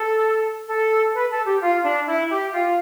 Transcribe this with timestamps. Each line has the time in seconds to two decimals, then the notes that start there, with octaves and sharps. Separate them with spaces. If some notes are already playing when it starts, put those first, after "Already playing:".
Already playing: A4
0.69 A4
1.14 B4
1.31 A4
1.45 G4
1.61 F4
1.84 D4
2.07 E4
2.30 G4
2.53 F4